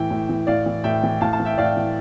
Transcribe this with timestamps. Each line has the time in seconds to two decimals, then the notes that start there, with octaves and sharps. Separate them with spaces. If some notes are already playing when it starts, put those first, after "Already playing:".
Already playing: A2 E3 E5 G5
0.10 A2
0.29 E3
0.47 A2 D5 F5
0.66 E3
0.84 A2 E5 G5
1.03 E3
1.21 A2 F5 A5
1.33 F5 A5
1.39 E3
1.45 E5 G5
1.57 A2 D5 F5
1.76 E3